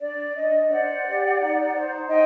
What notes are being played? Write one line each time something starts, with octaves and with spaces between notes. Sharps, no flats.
D4 D5
D4 D#5
C5 D5 F#5
G4
D#4
C5
D#4 D#5 G5